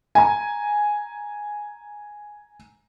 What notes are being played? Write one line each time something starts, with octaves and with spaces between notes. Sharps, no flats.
G#5 A#5